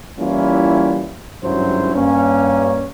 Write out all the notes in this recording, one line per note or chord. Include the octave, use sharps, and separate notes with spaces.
E3 G3 A#3 C#4 E4 F4
G#1 G2 F#3 C#4 E4 C5
G2 A#3 C#4